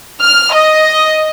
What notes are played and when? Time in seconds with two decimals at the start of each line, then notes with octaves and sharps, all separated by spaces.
0.21 F6
0.53 D#5